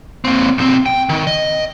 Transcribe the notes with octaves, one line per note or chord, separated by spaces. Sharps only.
A#3 C4
B1 C4
G5
D#3
D#5